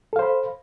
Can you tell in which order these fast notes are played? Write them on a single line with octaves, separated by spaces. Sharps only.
A4 F5 C5 B5